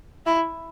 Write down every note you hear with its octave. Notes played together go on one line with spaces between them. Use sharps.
E4